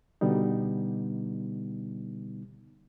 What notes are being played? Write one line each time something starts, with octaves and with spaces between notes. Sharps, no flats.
B2 D3 G3 B3 D#4